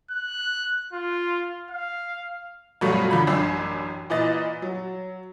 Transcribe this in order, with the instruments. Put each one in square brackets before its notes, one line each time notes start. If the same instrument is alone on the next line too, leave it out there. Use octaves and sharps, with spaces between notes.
[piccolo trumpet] F#6
F4
F5
[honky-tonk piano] G2 B2 F3 F#3 A3 F4
D3 F3 B5 G#6
A1 F#2 D4 E6
A#2 E3 D#5 A6
F#3